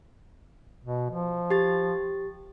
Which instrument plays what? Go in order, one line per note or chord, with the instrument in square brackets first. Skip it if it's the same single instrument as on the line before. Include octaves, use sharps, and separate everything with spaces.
[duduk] B2
F3
[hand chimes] G4 A6